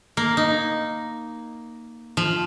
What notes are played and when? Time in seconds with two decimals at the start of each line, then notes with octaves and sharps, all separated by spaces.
0.17 A#3
0.37 D#4
2.17 F3